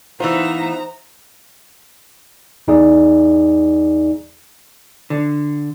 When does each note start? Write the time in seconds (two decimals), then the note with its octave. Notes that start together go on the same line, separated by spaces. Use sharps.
0.20 E3 B3 D#4 F4 C5 E5 A#5
2.68 E2 D#4 G#4 D5
5.10 D3